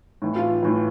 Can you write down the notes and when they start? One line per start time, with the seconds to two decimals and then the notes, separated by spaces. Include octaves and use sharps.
0.22 A2 E3
0.36 F4
0.63 A2 E3